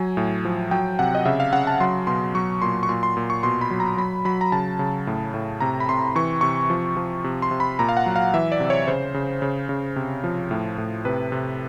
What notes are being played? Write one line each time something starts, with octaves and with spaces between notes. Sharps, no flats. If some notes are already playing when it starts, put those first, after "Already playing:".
Already playing: F#3 G#5
A2
F3
F#3 G5
C3 F#5
D#5
C#3 E5
F5
C#3 F#5
A5
F#3 C6
B2 C6
F#3 C#6
A#2 C6
C#6
A#2 C6
C6
A#2
C#6
B2 C6
B5
F#3
A#5
F#3 B5
F#3 B5
A#5
C#3 A5
C#3
A2
A2
C3 A#5
B5
C3 C6
E3 C#6
C3 C#6
F3
F3
C3
C6
C3
B5
A#2 A#5
F5
F#5
F#3
F5
E3 E5
D5
C3
C#5
C#3 C5
C#3
C#3
C#3
C3
F3
A2
A2
C3 B4
C3